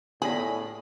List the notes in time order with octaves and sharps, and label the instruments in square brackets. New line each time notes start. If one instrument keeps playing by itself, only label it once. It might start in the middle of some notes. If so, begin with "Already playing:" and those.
[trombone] A2 [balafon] B3 G4 D5 [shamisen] G#4 [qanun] B5